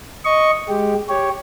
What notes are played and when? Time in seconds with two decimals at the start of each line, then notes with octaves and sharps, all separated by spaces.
0.25 D#5 C#6
0.68 G#3 G4
1.09 G4 C#5